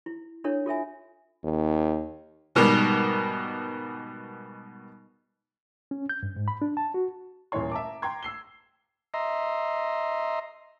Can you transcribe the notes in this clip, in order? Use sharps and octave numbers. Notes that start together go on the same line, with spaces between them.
E4
D4 E4 A4 C#5
F4 A4 E5 G#5
D#2
G#2 B2 D#3 G3
C#4
G6
G2
G#2
B5
D4
A5
F#4
D#1 A#2 E3 E4 C#5 C6
E5 A5 A#5 D6
G5 A#5 C6 G#6
E6 C7 G7
D#5 E5 A#5 C6